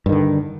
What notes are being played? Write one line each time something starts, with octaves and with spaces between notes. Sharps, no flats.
G2 D3 D#3